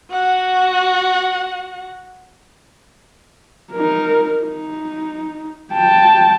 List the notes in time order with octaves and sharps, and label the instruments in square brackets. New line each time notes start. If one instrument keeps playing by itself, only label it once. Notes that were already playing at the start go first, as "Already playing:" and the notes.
[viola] F#4 F#5
[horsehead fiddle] D#4 A#4
D#4
G5 A5